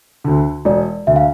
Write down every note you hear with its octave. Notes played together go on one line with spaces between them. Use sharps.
D2 D3
E1 D5
D2 D3 E5
F5